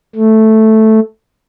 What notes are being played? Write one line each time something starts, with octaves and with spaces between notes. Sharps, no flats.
A3